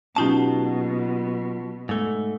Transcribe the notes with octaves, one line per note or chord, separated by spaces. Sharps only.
B2 F#3 C#4 D#4 F4 G4 A5
G#2 A3